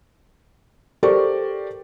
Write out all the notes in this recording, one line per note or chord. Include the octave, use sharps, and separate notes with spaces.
G4 A4 A#4 C5 D5 C#6